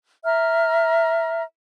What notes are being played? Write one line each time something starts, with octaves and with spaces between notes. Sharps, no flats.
E5 A#5 F6